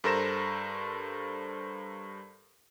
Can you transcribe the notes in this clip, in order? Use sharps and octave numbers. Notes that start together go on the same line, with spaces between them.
G2 A4 A#4 C5 A#6 E7